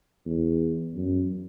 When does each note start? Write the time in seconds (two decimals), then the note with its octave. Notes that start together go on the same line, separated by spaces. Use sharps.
0.26 E2
0.95 F#2